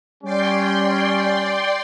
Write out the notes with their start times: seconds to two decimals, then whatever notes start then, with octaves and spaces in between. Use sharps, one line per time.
0.24 G3 C#4 D5 G5 C6